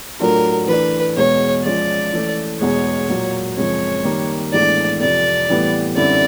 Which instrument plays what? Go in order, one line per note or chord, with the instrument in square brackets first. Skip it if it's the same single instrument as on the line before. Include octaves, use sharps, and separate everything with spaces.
[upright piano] A2 F#3 A3 D4 F4 [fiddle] A#4
[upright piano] E3 A3 D4 [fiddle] B4
[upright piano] E2 B2 G#3 [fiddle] C#5
[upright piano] F3 G#3 C#4 F4 [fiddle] D5
[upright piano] E3 A3 C#4
[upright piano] E2 B2 G#3 [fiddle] C#5
[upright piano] A#2 F#3 A#3
[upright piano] F#2 C#3 F3 G#3 C4 [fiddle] C#5
[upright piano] D#3 G3 A#3
[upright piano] A2 E3 G#3 B3 D4 [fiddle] D5
[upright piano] F2 C3 F3 [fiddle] D5
[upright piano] A2 E3 G3 B3
[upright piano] F#2 D3 G3 C4 E4 [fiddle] D5